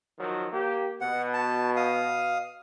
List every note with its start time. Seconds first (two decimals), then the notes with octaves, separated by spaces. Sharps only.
0.20 D#3 F3 F#3
0.53 A#3 G4
1.01 B2 F#5
1.34 A5
1.76 F5 D#6